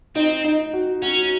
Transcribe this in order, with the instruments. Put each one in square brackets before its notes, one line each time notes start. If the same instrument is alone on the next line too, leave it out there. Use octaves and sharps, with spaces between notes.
[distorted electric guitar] C4 [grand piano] D#4
[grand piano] D#4
F#4
[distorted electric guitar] C#4 [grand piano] F#4